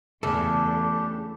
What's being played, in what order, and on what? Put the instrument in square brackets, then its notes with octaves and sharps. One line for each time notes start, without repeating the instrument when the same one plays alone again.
[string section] E2 [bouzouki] C#3 [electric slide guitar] A3 A4 [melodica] D4 G4